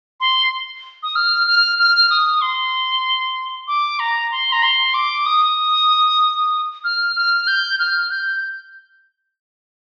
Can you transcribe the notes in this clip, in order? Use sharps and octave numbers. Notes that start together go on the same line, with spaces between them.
C6
D#6
F6
F6
F6
D#6
C6
D6
A#5
C6
A#5
C6
D6
D#6
F6
F6
G6
F6
G6